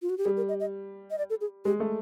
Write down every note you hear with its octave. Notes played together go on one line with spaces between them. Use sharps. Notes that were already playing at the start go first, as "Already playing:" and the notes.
F4
F#4
G4
G3 G#4
A#4
D#5
D#5
D#5
D5
A4
G#4
G#3 G4
A3